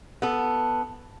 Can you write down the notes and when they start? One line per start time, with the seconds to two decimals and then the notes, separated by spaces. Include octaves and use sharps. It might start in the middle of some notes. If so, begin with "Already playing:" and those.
0.22 B3 A4